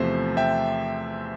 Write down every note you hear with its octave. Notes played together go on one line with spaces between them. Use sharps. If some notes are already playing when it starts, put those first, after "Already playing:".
Already playing: E2 C3 F3 A3 C5 E5
E5 G5